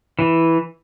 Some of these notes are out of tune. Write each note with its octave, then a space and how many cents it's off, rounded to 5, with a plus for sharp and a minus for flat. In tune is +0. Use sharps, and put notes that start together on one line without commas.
E3 -5